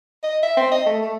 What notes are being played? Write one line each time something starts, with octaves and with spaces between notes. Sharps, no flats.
D#5
E5
C4
D#5
A3
A3